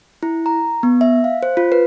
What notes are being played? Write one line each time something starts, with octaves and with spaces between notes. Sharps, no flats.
E4
A#5
B3
E5
F5
C5
F4
B4